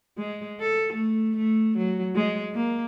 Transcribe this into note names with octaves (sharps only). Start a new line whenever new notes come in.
G#3
A4
A3
A3
F#3
G#3
A#3